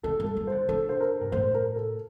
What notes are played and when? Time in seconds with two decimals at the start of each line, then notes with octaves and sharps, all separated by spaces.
0.03 D#3 A4
0.20 G3
0.25 A4
0.37 G3
0.47 D3 C5
0.68 D3 A4
0.89 C5
1.00 A#4
1.21 G2
1.32 A2 C5
1.54 A#4
1.76 A4